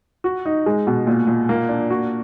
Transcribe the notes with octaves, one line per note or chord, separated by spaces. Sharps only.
F#4
D#4
G#3
B2
A#2
A#2
A#3
D4
F#4